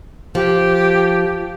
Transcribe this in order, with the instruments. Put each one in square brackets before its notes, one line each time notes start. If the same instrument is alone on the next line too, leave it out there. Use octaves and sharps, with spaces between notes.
[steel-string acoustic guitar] F3 [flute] G4